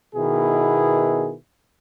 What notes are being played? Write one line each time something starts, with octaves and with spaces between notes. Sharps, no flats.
B2 D#3 B3 E4 G#4